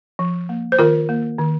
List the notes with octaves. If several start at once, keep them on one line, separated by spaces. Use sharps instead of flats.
F3
A#3
C5
D#3 F4 A#4
A#3
D#3